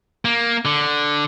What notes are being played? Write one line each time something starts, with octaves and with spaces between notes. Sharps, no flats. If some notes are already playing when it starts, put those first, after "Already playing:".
A#3
D3